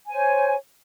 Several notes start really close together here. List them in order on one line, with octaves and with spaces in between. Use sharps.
G#5 C5 C#5